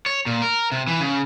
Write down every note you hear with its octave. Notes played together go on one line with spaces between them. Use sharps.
C#5
A#2
A#4
C3
E3
C#3